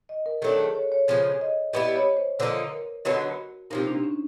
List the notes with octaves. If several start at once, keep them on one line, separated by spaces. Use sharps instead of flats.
D#5
A#4
D#3 F#3 A3 D4 A4
G#4
C#5
C#5
C#3 F3 G#3 C#5
D#5
G3 B3 E4 D#5
C#5
C5
D3 F3 A#3 D#4 B4
A#4
D3 F#3 B3 D#4 F#4
C3 F3 A#3 D#4
D4
C#4